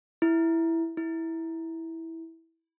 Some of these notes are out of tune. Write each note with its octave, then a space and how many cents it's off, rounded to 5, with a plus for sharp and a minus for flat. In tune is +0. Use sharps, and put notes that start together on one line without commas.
E4 +0
E4 -10